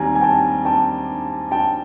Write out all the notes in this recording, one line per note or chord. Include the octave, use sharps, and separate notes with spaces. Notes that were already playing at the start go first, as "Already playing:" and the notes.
Already playing: D#2 G3 C4 G#5 A#5
G#5
G5 A5
G5 A5
G5 A5